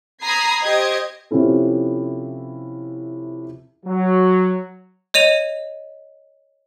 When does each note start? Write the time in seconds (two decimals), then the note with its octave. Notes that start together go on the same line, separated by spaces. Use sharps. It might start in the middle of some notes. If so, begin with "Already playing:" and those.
0.21 A#5 B5 D#6 G#6 C7
0.61 G4 C5 D#5 G#6
1.31 C3 F3 C#4 E4 A4
3.85 F#3
5.14 C#5 D#5 D#7 F7